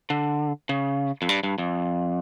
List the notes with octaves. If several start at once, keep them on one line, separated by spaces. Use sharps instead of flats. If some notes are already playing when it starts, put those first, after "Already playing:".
D3
C#3
F2
G2
G2
F2